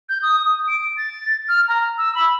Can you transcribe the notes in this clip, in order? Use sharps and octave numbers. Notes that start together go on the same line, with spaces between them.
G6
D#6
D#6
D7
A6
F6
A#5
E6
B5